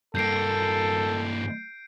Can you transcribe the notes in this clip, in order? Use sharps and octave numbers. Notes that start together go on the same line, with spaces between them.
G2 A#3 A4 G6 C7 D7